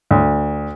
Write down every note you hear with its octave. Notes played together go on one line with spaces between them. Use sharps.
D2